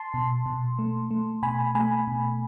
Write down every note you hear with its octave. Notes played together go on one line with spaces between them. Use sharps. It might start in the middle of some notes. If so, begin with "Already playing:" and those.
Already playing: A5 C6
B2
B2
A3
A3
B2 G#5 B5
A3 G#5 B5
B2